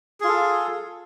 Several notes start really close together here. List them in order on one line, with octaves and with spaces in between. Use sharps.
G#4 F4 A4